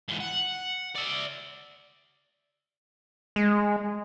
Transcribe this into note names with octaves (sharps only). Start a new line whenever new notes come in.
G#2 E3
F#5
D5 E5
G#3